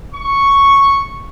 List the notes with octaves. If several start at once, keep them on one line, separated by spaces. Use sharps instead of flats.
C#6